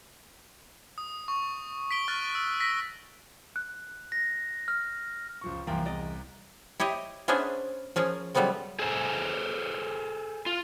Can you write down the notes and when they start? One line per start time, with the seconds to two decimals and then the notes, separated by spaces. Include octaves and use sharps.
0.98 D#6
1.28 C#6
1.91 B6 D7 G7
2.08 C#6 F6 F#6 A6
2.35 E6
2.60 E6 A#6 B6
3.56 F#6
4.12 A#6
4.68 F6
5.41 C#2 F3 C#6
5.67 C2 E3 F3 A#3 G5 A#5
5.85 E2 D5 D#5
6.80 E4 G4 C#5 D#5
7.28 B3 C#4 D4 G#4 C5 E5
7.96 F3 C#4 G#4 A#4
8.35 C#3 F#3 G3 A3 B3 C4
8.79 G#4 A4 C5 G#5
10.46 F4